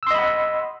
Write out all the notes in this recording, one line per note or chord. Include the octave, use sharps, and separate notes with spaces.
D#5 F#5 B5 C6 E6